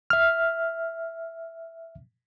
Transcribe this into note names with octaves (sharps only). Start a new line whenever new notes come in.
E5 F6